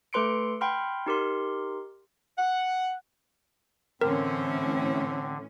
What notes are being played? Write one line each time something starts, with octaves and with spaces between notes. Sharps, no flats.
A3 A4 B4 C6 C#7 D7
F#5 G5 B5 C6 F6
D#4 G4 A#4 C6
F#5
A2 D3 E3 C4 C#4 A#4